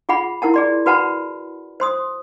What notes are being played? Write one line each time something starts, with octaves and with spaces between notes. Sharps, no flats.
F4 G#4 F#5 B5
E4 A#4 F#5 A5
G#4 D5 C6
F#4 B4 F#5 A5 B5
C5 C6 D#6